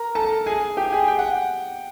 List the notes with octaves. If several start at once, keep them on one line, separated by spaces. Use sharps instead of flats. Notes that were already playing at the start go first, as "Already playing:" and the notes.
Already playing: A#4 A#5
A4 A5
G#4 G#5
G4 G5
G#4 G#5
G5
F#5